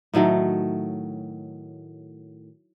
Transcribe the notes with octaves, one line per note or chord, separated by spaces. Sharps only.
A2 D#3 F#3 A3